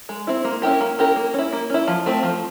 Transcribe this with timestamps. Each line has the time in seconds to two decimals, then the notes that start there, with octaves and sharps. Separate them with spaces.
0.09 G#3
0.27 C4 E4
0.45 A#3
0.62 C#4 E4 G4 A#4
0.81 A#3
0.99 C#4 E4 G4 A#4
1.16 A#3
1.34 C#4 E4
1.53 A#3
1.70 C#4 E4
1.88 F3
2.06 A3 C4
2.23 F3